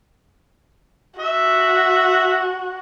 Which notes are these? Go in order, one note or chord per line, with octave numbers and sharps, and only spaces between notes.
F#4 E5